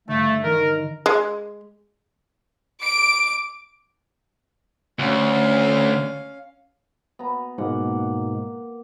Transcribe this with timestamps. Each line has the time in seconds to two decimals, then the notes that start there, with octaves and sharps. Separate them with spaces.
0.08 G2 D3 A3
0.44 D#3 A#4
1.06 G#3
2.81 D6 D7
4.99 D2 C#4 F5
7.19 B3 A#5
7.58 G#2 B2 A#3 F#5